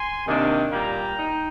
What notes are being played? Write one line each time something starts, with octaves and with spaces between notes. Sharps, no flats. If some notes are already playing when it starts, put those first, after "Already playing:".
Already playing: G#5 C6
C3 D#3 A#3 D4
A#2 G3 A#3 G5 A#5
D#4